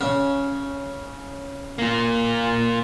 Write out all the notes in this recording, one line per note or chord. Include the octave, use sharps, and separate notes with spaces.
C#3 C#4
A#3 F4